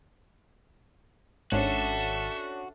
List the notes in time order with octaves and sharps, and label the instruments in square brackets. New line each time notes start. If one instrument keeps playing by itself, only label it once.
[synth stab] G#1 [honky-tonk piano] C#4 D4 [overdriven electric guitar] F#4 [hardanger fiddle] A4 E5